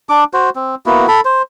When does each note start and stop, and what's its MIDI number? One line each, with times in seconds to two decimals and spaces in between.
0.09 0.24 62
0.09 0.24 86
0.33 0.50 66
0.33 0.50 72
0.56 0.75 60
0.86 1.06 58
0.86 1.06 59
0.86 1.06 64
0.86 1.06 66
1.08 1.21 69
1.08 1.21 83
1.25 1.42 72